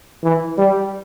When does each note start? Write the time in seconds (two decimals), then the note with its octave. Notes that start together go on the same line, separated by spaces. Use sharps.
0.24 E3
0.58 G3